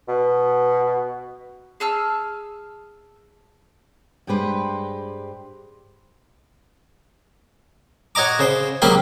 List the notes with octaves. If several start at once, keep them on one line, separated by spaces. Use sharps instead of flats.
B2
G#4 A5 E6 F6
G2 G#3 G4 B4 C5
F#4 C#5 D#5 A#5 D6
C#3 C5 C6
C#2 F#3 A#3 G4 B5 C6